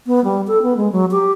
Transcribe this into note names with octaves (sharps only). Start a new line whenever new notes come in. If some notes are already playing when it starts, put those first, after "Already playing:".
B3
G3
A4
B3
G#3
F#3
G4